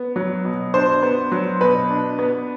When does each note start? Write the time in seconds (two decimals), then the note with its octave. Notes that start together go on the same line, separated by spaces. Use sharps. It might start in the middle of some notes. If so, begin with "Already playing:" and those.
Already playing: B3
0.16 F#3
0.45 B2
0.74 D4 C5
1.03 B3
1.32 F#3
1.61 B2 B4
1.90 D4
2.19 B3